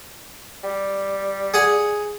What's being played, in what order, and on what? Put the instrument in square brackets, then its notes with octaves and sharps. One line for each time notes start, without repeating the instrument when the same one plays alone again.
[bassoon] G3
[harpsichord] G#4 F#5 G#5